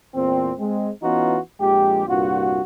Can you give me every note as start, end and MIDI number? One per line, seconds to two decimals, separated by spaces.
0.14 0.51 40
0.14 0.51 46
0.14 0.51 52
0.14 0.51 60
0.59 0.90 56
0.59 0.90 60
1.03 1.38 52
1.03 1.38 59
1.03 1.38 61
1.03 1.38 63
1.03 1.38 65
1.03 1.38 66
1.60 2.06 34
1.60 2.06 41
1.60 2.06 56
1.60 2.06 67
2.07 2.61 36
2.07 2.61 43
2.07 2.61 46
2.07 2.61 65
2.07 2.61 66